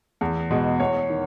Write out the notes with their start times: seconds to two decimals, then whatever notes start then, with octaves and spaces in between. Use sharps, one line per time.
0.21 E2
0.51 B2 G#3
0.80 E2 C#5
1.10 D#3